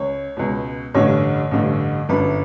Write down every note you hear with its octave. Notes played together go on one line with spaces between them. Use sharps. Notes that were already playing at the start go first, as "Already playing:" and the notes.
Already playing: C#2 C#5
C#2 B2
A1 G2 D3 C#5
A1 G2 D3
G1 F#2 D3 B4